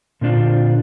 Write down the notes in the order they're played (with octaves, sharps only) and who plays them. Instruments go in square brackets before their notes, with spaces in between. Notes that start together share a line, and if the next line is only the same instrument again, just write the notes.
[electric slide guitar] A#2 D3 C4 D4 F4